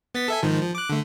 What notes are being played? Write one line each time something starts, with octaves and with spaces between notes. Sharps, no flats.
B3 A6 B6
A4 E5 G#5
G#2 D#3 F3
F3
D6 F#6
D3 A3